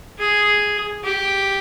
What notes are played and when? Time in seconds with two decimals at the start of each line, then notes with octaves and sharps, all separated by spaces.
0.19 G#4
1.04 G4